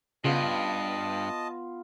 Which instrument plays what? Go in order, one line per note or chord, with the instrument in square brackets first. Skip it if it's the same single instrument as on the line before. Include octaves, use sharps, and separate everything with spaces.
[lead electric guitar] G2 [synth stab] C#3 [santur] B3 F4 B5 [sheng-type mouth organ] D#5 A5